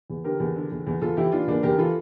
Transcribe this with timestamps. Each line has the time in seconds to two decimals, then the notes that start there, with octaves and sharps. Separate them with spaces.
0.10 E2
0.24 D3 G4 A#4
0.40 E2
0.56 D3
0.71 E2
0.87 E2
1.02 E2 F4 A4
1.17 E3 E4 G4
1.32 E3 D4 F4
1.47 E2 A#3 D4
1.63 E2 G4 A#4
1.78 E3 F4 A4